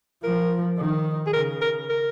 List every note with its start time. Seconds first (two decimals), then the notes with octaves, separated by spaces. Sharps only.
0.23 F3 A#4
0.78 D#3
1.27 G#4
1.33 C#3 A#4
1.62 A#4
1.89 A#4